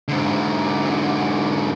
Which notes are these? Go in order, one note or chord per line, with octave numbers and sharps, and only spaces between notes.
G#2 D3